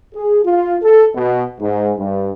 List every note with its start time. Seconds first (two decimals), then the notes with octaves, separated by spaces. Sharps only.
0.14 G#4
0.44 F4
0.81 A4
1.14 B2
1.61 G#2
1.98 G2